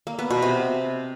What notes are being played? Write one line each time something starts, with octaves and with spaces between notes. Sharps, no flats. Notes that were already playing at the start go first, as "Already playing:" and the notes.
A#3
B3
B2
C3